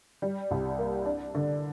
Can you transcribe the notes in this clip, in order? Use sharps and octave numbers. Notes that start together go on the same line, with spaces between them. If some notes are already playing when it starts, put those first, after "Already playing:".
G3
C2
A#3
D4
D3